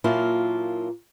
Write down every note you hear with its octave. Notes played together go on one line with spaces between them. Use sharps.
A#2 F#3 A#3 E4 F4 A5